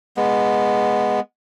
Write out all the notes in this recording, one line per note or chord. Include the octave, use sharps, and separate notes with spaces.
G#3 B3